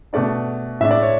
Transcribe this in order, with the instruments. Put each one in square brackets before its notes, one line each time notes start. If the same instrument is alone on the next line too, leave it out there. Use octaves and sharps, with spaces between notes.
[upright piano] B2 A3 D4 D5
A2 G#3 D4 E5
D5
C#5